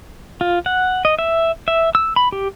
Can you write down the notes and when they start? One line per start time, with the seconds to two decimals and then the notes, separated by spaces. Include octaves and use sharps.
0.41 F4
0.66 F#5
1.05 D#5
1.19 E5
1.68 E5
1.95 E6
2.16 B5
2.32 G4